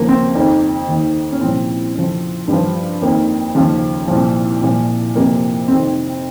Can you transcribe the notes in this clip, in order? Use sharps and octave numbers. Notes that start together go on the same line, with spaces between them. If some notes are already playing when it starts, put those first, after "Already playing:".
Already playing: D#2 C#3 F3 A#3
C4
F2 D#3 D#4
D#2 D#3
C#4
C2 A#2 F3 C4
F2 C#3 F3
G2
F3
F2 D#3 A#3
D#2 C#3 F3
C2 A#2 F3
C2 A#2 F3
F2 C3 F3 A#3
F2 C3 D#3 C4